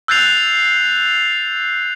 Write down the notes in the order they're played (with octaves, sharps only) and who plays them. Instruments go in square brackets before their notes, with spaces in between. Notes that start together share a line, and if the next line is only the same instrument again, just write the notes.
[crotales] E6 F#6 G6 A6 C7 F7